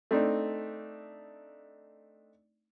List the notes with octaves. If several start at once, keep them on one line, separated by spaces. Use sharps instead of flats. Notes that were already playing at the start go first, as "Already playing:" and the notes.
A3 C4 D4 D#4